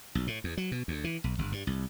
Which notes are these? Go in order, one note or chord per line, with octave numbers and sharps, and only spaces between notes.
B1
A2
E2
F#3
B2
D2
E3
B1
G1
G2
C2